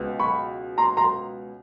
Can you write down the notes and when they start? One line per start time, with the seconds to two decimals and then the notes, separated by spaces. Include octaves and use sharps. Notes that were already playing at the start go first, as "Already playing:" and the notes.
Already playing: C#2 B2 B3
0.19 B5 C#6
0.78 A#5 C6
0.97 A#5 C6